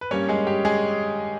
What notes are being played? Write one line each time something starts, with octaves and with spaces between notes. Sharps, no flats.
B4
G2 G3 A#3 C#4 C#5
G#3 G#4
G4
G#3 G#4